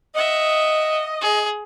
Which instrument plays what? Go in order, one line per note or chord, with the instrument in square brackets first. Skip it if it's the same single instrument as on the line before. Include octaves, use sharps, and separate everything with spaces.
[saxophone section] D#5 [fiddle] E5 F#5
[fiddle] G#4